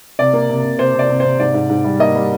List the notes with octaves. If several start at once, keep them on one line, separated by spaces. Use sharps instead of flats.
C3 D5
A#3
C3
C3
C3 C5
C3 D5
C3
C3 C5
G#2 D5
G#2
G#2
G3
A#3 D#5
G3